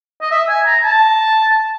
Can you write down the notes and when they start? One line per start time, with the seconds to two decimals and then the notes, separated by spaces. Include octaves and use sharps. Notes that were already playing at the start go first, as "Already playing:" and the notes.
0.22 D#5
0.31 E5
0.49 G#5
0.66 A#5
0.84 A5